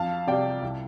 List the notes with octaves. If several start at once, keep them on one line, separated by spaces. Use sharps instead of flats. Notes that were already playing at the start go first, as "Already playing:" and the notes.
Already playing: F2 F5 A5
C3 G3 D5 G5
C2